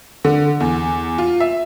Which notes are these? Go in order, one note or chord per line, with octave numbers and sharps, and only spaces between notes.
D3
E2
F4
E5